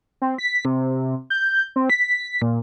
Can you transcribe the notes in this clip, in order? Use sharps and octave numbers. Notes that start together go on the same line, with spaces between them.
C4
B6
C3
G6
C4
B6
A#2